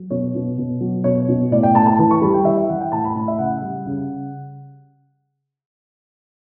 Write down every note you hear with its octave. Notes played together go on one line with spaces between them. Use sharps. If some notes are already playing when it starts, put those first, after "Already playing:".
Already playing: F#3
B2 C#5
B2
B2
F#3
B2 C#5
B2
A2 D5
G5
A2 A5
A5
E3 A5
C#6
G3 B5
G5
E3 E5
E5
E3 F#5
G5
A2 A5
B5
A2 B5
E5
C#3 F#5
G3
C#3